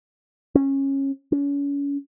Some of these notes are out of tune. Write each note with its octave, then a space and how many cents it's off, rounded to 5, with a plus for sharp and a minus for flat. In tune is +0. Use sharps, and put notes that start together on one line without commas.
C#4 -20
C#4 +35